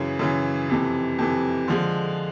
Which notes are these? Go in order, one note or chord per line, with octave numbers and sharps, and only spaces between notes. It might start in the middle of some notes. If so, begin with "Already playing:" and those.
Already playing: F#2 C#3 E3
F#2 C#3 E3
F2 C3 E3
F2 C3 E3
D3 F3 G#3